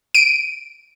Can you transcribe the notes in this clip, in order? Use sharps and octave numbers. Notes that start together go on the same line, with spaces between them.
D7 D#7